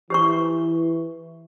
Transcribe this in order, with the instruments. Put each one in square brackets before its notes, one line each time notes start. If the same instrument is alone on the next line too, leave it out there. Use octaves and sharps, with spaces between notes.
[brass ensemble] E3 [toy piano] G4 C5 C#6